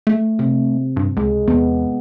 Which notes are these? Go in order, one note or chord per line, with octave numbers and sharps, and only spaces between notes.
A3
C3
G2
C#2 G#3
E2 B3